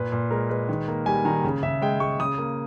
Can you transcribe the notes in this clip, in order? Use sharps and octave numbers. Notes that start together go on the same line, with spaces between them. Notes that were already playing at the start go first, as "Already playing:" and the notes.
Already playing: A#2 B4
A#2
G#3 A#4
G#3 B4
D#3
A#3
G3 G#5
D#3 A#5
C#3
C#3 E5
G#3 G5
G#3 C#6
C#3 D#6
A#3